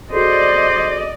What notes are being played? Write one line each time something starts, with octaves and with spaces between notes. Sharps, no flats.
F#4 G#4 A4 C5 D5 D#5